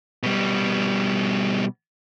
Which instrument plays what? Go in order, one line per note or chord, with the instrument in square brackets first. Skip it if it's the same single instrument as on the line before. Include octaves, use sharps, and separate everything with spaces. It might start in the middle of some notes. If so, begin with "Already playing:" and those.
[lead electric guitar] B2 G3